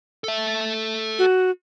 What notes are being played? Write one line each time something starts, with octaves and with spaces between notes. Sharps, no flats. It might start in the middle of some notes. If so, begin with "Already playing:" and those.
A4 E5
F#4